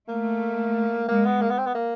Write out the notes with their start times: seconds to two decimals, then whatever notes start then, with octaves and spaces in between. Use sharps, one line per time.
0.08 A3 A#3
1.08 G#3 A#3
1.25 B3
1.41 A#3
1.50 B3
1.58 C4
1.66 B3
1.75 A#3